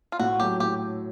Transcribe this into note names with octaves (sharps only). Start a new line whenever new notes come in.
F4
A2 F#4
F#3 A3 G4
A2 G4